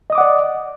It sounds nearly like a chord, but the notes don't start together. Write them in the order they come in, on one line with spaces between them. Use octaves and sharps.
D#5 D#6 D6 F#5 D5